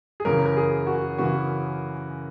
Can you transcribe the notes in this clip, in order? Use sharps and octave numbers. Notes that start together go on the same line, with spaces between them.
G#4
F#2 C#3 E3 A#4
A#4
G#4
F#4
C#3 E3 F#4